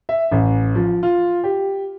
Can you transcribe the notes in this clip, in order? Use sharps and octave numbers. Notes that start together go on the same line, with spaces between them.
E5
A1
F3
F4
G4